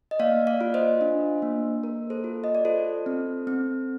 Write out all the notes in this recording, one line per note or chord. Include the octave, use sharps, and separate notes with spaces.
D#5
A#3 D5 F5
D5 F5
F4
C5 D#5
D4
A#3
A#3 A#4
A4 C5
F4
D#5
D5
F4 A4 C5
C4
C4